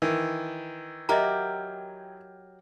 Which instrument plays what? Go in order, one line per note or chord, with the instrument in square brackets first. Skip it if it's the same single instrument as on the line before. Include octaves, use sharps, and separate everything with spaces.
[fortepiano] D#3 E3
[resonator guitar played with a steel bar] F#3 G4 A#4 [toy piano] D#5 E5 A#5